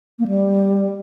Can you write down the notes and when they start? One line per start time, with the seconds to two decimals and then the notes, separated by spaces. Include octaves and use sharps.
0.19 A#3
0.27 G3